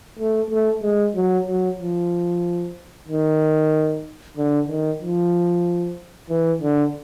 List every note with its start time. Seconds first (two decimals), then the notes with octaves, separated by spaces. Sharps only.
0.19 A3
0.50 A3
0.83 G#3
1.16 F#3
1.47 F#3
1.79 F3
3.08 D#3
4.37 D3
4.68 D#3
5.02 F3
6.30 E3
6.62 D3